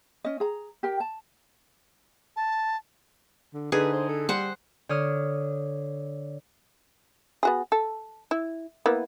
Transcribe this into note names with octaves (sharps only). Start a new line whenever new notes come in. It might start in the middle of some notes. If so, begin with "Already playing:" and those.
C#4 D#5
G#4 A#5
G4 A#4 G5
A5
A5
D3
D3 D#4 G#4 B4
C5
A4
G3 C5 F#5
D3 C#5 D#6 F6
B3 F#4 G#4
A4
E4
A#3 B3 E4